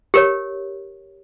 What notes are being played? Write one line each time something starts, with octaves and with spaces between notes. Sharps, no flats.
G4 A#4 C#5